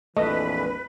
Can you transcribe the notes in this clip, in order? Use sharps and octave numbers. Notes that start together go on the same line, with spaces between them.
A#1 F2 E3 A3 B4 D#5